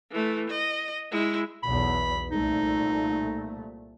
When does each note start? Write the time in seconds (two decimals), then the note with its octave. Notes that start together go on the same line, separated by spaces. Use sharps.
0.11 E3 A3
0.50 D#5
1.11 G#3 E4
1.63 B1 E2 B5
2.31 C2 A#2 A3 D#4